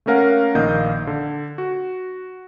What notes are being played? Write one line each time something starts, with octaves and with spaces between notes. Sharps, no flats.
A3 A#3 C#4 A#4 F5 F#5
A#1 D#3 A#3 D#5 F5 G6
D3
F#4